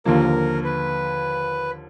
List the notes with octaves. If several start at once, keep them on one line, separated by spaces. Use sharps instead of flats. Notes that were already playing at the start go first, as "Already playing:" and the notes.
D#2 D3 F3 A#3 A#4
B4